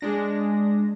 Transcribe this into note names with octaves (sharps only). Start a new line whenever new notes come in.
G#3 D4 A#6